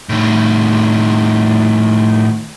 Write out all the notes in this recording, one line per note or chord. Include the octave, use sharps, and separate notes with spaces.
A2 D#3